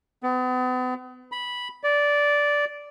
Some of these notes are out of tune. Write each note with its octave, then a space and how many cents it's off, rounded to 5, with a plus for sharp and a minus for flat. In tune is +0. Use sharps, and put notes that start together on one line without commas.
B3 +40
B5 -10
D5 -10